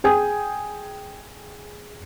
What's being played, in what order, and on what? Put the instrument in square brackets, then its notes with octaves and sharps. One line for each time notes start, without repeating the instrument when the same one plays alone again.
[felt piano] G#4 G5 G#5 D#6